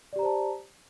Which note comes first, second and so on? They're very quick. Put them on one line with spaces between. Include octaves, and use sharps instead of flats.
D5 G4 A#5 C5 A5